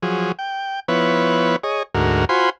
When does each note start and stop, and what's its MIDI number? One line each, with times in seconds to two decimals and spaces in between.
0.03 0.32 53
0.03 0.32 54
0.03 0.32 68
0.39 0.80 79
0.88 1.56 53
0.88 1.56 59
0.88 1.56 64
0.88 1.56 71
0.88 1.56 73
1.64 1.83 68
1.64 1.83 73
1.64 1.83 75
1.95 2.25 38
1.95 2.25 44
1.95 2.25 66
1.95 2.25 70
2.29 2.50 65
2.29 2.50 66
2.29 2.50 72
2.29 2.50 80
2.29 2.50 83
2.29 2.50 84